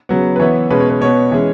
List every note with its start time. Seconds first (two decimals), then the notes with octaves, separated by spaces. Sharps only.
0.09 C#3 F#3 B3
0.36 B4
0.40 E3 B3 C#5
0.70 B2 G#3 C#4 B4
0.80 C#5
0.90 B4
1.01 B2 B3 C#5
1.32 E3 G#3 C#4